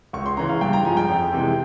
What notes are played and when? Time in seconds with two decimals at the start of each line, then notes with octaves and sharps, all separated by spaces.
0.13 C#2 C#6
0.26 C6
0.37 C#3 E3 A#5
0.49 F5
0.61 G2 G5
0.73 A#5
0.85 F3 G#3 G#5
0.97 G5
1.09 F2
1.32 C3 E3 G#3